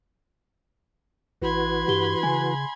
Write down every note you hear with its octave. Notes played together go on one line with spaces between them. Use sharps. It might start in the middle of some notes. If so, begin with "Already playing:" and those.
A1 E3 F#4 B4 B5 C6 G#6
G2 G4 G7
C#3 G#5